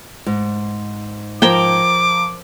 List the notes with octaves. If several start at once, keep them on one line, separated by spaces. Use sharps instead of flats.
G#2
F3 A#4 C5 G5 A#5 D6 G#6